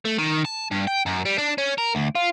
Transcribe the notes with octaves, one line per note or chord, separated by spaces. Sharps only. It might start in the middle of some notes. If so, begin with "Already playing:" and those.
A3
D#3
A5
G2
G5
F#2
G3
D4
C#4
A#4
D2
F4